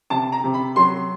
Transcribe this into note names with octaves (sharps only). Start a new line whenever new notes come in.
C3 A5
A#5
C3
B5
F#3 C6